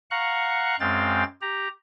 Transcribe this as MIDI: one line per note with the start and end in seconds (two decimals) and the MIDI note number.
0.11 0.76 77
0.11 0.76 78
0.11 0.76 82
0.11 0.76 85
0.11 0.76 90
0.80 1.24 42
0.80 1.24 56
0.80 1.24 60
0.80 1.24 77
0.80 1.24 79
0.80 1.24 93
1.41 1.68 67
1.41 1.68 82